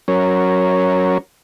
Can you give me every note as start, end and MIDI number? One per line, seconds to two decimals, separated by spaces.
0.08 1.18 54
0.08 1.18 61
0.08 1.18 70
0.08 1.18 73